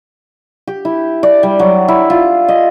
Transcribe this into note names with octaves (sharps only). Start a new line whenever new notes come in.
G4
E4
D5
G3
F#3
E4
F4
D#5